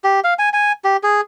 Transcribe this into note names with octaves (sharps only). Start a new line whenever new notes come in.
G4
F5
G#5
G#5
G4
G#4